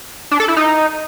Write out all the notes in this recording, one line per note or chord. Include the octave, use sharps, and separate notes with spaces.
D4
A4
E4
D#4